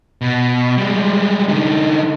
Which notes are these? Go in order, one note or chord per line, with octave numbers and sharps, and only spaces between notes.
B2
G3 G#3
D3 D#4